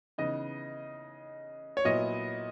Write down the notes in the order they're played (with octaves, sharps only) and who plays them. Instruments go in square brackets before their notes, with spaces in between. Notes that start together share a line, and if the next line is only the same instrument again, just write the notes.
[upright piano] C#3 E3 B3 D#4 [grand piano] D#5
[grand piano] C#5
[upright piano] A#2 F#3 B3 E4 [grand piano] D#5